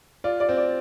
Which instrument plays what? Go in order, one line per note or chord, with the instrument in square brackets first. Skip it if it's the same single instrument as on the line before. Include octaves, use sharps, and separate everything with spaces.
[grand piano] F4 [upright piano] D5
[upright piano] D5
[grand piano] C4
[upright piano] D5